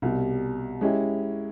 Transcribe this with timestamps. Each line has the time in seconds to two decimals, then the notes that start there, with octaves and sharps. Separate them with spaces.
0.02 C2 B2 G3
0.81 G#3 C#4 E4 G4